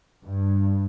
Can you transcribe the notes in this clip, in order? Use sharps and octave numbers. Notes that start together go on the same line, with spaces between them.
G2